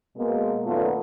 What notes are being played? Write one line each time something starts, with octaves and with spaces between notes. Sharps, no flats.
B2 G#3 A#3
F#2 A#2 D#3 A3 B3 F4